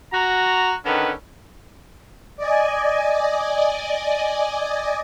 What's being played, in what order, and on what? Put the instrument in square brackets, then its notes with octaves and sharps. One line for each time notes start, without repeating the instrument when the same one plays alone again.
[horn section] F#4 A#5
D3 D#3 C#4 B4
[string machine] D5 D#5 G#5